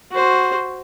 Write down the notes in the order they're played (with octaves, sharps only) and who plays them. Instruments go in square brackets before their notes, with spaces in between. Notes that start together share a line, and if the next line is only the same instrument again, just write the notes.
[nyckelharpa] F#4 C5